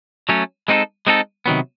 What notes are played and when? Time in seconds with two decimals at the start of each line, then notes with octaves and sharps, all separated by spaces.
0.29 F#3 A3 C#4
0.68 G#3 C4 D#4 F#4 A4
1.07 G#3 C4 D#4 F#4 A4
1.46 C3 D#3 F#3 B3